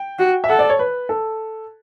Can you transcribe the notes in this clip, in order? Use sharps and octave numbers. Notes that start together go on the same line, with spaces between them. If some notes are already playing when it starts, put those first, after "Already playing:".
Already playing: G5
F#4
E5
A4 F#5
D5
C#5
B4
A4